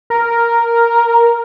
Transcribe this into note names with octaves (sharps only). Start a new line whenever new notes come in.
A#4